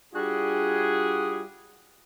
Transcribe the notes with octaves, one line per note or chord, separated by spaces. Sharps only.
G3 D4 F4 F#4 G#4